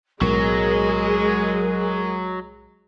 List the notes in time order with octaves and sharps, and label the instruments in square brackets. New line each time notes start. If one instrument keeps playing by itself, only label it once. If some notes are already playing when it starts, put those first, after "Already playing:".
[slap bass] B1 A2 [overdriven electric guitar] F#3 [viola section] G#3 G#4 [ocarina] A#4